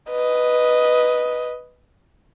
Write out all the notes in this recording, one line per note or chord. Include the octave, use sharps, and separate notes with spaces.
B4 D#5